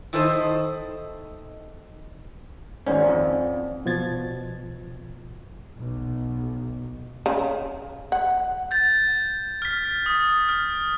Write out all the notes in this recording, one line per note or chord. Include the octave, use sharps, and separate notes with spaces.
D#3 E4 A4 C5 D5 D#5
G#1 G#2 C#4 C5 D5 F#5
F2
B2 F3 G#6 A6
B1
C#3
F#5
G6 A6
F6 B6
D#6
F6